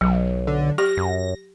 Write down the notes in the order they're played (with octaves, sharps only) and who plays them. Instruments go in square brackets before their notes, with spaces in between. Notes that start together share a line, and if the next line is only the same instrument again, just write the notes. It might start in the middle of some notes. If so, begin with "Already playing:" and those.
[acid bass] B1 [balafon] F#3
[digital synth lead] D3
[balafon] G4 [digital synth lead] A#6
[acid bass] F#2